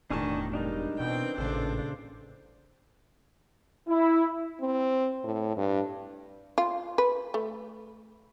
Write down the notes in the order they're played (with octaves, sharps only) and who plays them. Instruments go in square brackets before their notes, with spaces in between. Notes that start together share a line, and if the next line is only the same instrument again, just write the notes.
[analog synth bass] E1 [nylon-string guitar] A2 A5 [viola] D#3 [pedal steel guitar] D4 G#5 C#6
[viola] G3 G#3 [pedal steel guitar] D4 D#4 A#4
[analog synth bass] B2 [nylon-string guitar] E3 [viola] C4 G5
[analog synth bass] A1 [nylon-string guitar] A#2 C#3 G#3 [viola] D4 C5 [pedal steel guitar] A4
[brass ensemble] E4
[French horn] C4
A2
G2
[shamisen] F4
B4
A3